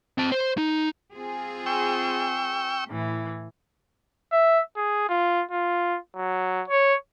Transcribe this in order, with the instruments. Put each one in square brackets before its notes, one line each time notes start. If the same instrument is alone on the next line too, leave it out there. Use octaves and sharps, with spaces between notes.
[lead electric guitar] C4 A5
C5
D#4
[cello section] C4 F4 G#4
[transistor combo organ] G5 C#6 E6
[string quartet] A2 E3
[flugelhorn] E5
G#4
F4
F4
F#3
C#5